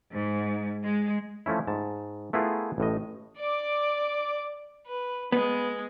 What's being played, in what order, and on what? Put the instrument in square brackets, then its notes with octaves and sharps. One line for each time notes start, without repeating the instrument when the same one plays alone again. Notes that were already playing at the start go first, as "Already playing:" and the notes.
[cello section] G#2
G#3
[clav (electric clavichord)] F3 A3 C#4 E4
G#2 A5
A3 B3 E4 F4 G#4 A#4
A1 A2 D#5
[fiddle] D5 D6
B4
[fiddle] G#3 [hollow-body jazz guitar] B3